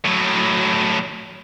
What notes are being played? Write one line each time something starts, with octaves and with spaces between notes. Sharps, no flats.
A2 F#3